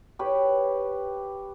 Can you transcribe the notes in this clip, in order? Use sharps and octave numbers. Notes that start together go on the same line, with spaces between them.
G4 B4 C#5